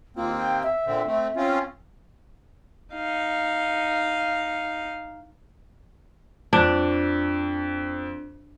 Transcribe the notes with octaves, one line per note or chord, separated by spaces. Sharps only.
D#2 A#3 C4 F4
G5
E5
A#2 D3 C4
A3 C4
C4 C#4 F4
D#4 F5
F2 D4